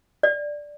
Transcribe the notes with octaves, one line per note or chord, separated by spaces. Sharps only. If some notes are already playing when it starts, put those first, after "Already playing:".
D5